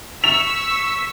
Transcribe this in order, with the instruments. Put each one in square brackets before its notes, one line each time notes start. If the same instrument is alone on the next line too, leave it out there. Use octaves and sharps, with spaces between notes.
[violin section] C#6 E6 B6 [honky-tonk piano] F7